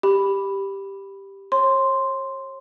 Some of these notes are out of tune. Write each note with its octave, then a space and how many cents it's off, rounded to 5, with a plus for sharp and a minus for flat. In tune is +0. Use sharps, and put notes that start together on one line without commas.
G4 +0 B5 +0
C#5 -40 C6 +0